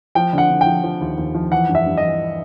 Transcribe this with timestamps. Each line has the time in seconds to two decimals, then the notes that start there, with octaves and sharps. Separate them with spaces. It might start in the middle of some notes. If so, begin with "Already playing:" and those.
0.15 F3 G5
0.33 D3 F#5
0.50 D3
0.61 G5
0.66 F3
0.83 F3
1.01 D#2
1.18 D#2
1.35 F3
1.52 E3 F#5
1.69 G2
1.75 E5
1.86 G2
1.97 D#5
2.03 E3